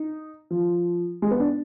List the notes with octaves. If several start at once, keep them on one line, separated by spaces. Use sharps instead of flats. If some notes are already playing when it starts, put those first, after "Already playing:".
Already playing: D#4
F3
G#3
B3
D4